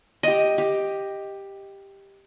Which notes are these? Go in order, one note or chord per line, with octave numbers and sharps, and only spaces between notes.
G4 D#5
G4